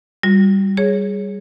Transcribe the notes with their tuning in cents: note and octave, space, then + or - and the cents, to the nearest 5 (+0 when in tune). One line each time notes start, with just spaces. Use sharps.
G3 +0 F#4 -40
G#4 +0 C#5 +0